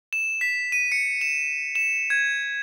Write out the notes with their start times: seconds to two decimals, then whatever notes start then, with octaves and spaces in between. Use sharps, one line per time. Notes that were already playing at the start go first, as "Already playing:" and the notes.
0.13 E7
0.41 B6
0.72 D#7
0.92 C#7
1.21 E7
1.75 E7
2.10 G#6